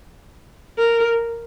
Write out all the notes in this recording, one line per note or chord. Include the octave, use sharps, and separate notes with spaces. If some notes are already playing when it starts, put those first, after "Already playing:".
A#4